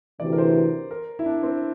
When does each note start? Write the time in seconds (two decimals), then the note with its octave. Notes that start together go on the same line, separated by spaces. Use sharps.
0.20 D2 C3 E3 D5
0.33 A#4
0.38 C5
0.91 A#4
1.19 E4
1.26 D4
1.43 C4